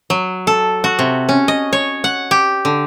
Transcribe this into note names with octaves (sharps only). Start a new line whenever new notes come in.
F#3
A4
F#4
C3
C#4
D#5
C#5
F#5
G4
D3